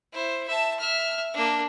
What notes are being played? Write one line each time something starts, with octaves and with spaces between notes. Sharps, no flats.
E4 C5
E5 A5
E5 F6
A#3 D4